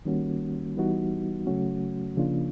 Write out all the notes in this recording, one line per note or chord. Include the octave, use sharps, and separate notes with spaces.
D#3 G3 A#3 C#4 F#4
E3 G3 B3 D#4 F#4
C#3 F#3 A3 C#4 F#4
C#3 F3 A#3 D4 F4